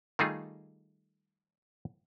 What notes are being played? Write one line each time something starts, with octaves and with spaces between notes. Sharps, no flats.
D#3 G3 A3 D#4 F4 G#4